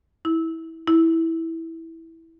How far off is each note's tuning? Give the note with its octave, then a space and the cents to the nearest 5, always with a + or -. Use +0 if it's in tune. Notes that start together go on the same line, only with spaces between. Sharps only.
E4 -20
E4 -10